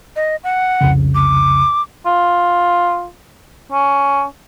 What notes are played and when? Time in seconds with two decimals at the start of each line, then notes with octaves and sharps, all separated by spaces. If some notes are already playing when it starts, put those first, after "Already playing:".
0.16 D#5
0.44 F#5
0.81 C2 F2 C#3
1.15 D6
2.06 F4
3.72 C#4